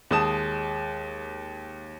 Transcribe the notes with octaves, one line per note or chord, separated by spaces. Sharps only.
D#2 G#3 A5 D#6 E7